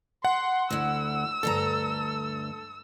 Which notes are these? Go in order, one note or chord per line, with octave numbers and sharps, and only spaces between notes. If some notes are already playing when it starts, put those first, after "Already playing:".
F#5 C6
D2 E4 E6
D2 G2 A4 A#5